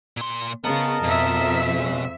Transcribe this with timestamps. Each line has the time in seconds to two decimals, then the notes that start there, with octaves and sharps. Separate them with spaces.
0.17 A#2 C6
0.64 C#3 B3 A#4 D#5 A5
1.04 F2 B2 E5
1.76 C#3 G#3